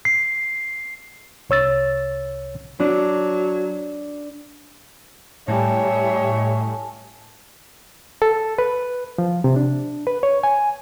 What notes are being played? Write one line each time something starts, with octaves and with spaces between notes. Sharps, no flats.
C7
C2 C#5 E6 A6
F#3 D4
A2 G3 C#5 E5 G#5 A5
A4
B4
F3
C3
D4
B4
C#5
G#5